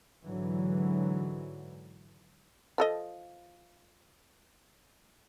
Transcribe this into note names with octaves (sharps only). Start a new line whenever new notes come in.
G#2 D3 E3 F#3
F3 A4 D#5